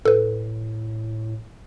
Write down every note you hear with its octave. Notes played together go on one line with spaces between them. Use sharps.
A2 A4 B4